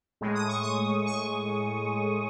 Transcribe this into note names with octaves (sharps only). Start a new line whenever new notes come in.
A2 G#3
D#6
C#6
D#6
C#6